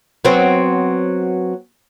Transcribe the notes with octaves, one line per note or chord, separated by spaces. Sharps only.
F#3 B3 C4